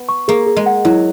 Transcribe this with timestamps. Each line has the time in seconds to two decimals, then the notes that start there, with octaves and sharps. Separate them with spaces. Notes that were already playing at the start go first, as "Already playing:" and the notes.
Already playing: B3
0.09 C#6
0.28 A#3 G#4
0.46 G#4
0.57 G#3
0.66 F#5
0.85 F#3 E4